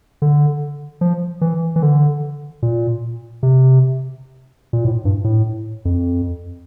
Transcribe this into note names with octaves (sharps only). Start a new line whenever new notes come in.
D3
F3
E3
E3
D3
A#2
C3
A#2
A2
G2
A2
F2